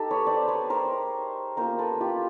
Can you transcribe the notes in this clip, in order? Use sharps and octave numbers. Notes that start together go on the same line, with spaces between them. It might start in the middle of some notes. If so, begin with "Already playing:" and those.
Already playing: G#3 D#4 G4 A4
B4 C#5
C5 D5
B4 C#5
A#4 C5
A#3 C#4 F4 A#4 C5
A4 B4
F4 G4